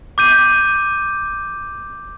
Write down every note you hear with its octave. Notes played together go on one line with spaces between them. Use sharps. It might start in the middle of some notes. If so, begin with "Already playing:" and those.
D6 G6 D#7